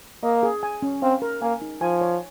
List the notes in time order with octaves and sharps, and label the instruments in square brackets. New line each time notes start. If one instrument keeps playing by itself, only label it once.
[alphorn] A#3 [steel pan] D#5
[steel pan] G#4
G#5
C#4
[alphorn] C4 [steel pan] F5
[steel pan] A#4
[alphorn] A#3 [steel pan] G#5
[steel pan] D#4
[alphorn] F3 [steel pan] G#5
[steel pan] C#5